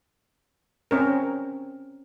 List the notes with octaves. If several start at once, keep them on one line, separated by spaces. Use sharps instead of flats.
C4 C#4 A#4